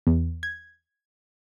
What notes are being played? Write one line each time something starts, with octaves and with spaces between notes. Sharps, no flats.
E2
G#6